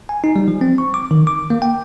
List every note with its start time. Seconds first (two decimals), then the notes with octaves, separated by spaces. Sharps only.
0.09 G#5
0.24 D#4
0.36 G3
0.48 F3
0.61 C4
0.78 C#6
0.94 D6
1.11 D#3
1.27 D6
1.50 A#3
1.62 G5